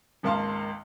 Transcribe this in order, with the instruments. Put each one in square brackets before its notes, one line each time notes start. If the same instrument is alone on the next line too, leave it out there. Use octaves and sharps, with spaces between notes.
[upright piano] G#1 C#2 A#3 F5 A5 C6